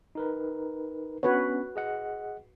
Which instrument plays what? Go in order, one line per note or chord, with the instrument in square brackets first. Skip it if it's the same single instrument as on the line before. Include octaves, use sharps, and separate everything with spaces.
[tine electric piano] D#4 A#4 B4
[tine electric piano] B3 C#4 D4 [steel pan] F#4 B4 C#5
[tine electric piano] G#4 D#5 F#5